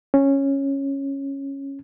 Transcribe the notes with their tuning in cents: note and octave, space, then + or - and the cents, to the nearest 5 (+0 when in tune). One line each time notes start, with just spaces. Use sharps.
C#4 -10